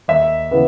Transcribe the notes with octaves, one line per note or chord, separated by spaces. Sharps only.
D#2 E5
C#3 E3 B3